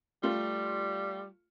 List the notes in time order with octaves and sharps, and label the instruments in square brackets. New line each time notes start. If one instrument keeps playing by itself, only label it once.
[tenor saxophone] G3 [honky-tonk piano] A3 F4